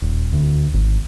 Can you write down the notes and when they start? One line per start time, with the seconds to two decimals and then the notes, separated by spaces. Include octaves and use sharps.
0.02 D#1
0.33 D2
0.74 G#1